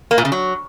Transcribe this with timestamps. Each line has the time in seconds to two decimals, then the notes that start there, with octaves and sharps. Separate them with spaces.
0.11 A#3
0.18 A#2
0.25 C#3
0.32 F#3